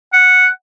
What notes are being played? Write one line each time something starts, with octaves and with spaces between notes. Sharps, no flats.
F#5